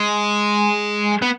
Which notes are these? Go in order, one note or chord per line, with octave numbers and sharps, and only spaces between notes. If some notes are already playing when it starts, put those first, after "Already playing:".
Already playing: G#3
B3